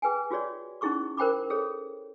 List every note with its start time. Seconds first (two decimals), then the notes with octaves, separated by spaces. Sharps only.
0.02 G#4 B4 G5 G#5
0.31 F4 F#4 G#4 C#5 D5
0.81 C#4 D#4 E4 G#4 C#6 D6
1.17 A#4 C5 G5 B5 D6
1.50 G#4 A4 C#5